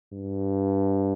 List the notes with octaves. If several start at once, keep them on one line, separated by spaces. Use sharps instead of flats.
G2